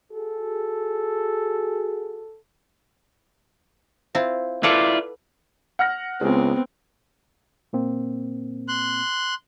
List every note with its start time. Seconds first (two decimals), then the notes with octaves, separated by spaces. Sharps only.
0.12 F#4 G#4 A4
4.15 C4 E4 F4
4.63 E4 F4 A4 B4 D5 F#5
5.79 F#5 F6 A#6
6.21 C#2 G#3 B3 C4
7.73 A#2 A#3 C4
8.68 C6 F#6